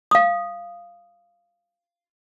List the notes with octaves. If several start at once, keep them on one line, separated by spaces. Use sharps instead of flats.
F5 D#6